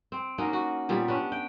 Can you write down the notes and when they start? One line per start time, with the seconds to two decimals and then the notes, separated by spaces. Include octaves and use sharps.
0.12 C4
0.38 A#3 C#4 D#4 F#4
0.53 F#4
0.89 A#2 G3 B3
1.08 C#4 D4 B4
1.32 G5